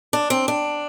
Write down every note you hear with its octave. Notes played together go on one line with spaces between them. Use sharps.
D4
C4
D4